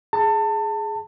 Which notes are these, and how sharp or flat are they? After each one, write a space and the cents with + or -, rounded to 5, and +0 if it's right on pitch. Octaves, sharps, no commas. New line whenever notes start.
G#4 +5 A5 +25